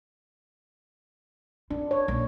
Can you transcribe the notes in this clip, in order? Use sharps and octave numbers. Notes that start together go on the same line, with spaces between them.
D4 F4
C#5
A#1